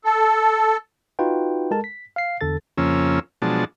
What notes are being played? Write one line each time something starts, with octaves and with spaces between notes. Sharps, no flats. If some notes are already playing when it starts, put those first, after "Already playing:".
A4
D#4 F4 F#4 B4 G5
G#3 A4 A#4 A5
B6
F5 C7
E2 D3 A4 A6
F2 C#3 F3 A#3 C#4 E6
B2 F3 F#3 G#3 D4 A5